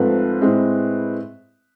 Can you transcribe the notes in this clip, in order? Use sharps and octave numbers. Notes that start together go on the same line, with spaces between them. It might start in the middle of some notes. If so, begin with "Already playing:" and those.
Already playing: G#2 F3 A3 C4 B4
A2 G#3 C4